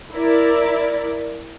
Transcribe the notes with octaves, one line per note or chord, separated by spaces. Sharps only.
E4 A#4 D5